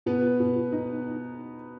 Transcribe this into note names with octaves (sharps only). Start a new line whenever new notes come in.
B2 B3 B4
B2
D#4